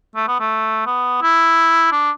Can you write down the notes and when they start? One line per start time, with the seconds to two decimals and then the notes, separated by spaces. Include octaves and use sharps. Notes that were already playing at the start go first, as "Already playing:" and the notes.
0.16 A3
0.28 B3
0.40 A3
0.86 B3
1.22 E4
1.92 D4